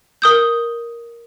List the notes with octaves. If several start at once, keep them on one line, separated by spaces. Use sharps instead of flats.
A#4 D#6 G6